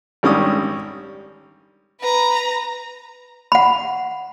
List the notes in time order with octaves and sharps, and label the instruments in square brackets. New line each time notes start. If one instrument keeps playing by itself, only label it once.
[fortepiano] G#1 G3 C#4 D4 D#6
[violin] B4 A#5
[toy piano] F#5 B5